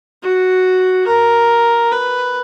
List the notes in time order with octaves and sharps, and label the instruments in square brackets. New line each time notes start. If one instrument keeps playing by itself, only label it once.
[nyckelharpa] F#4
A#4
B4